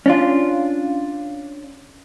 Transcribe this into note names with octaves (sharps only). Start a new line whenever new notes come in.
C#4 D4 F4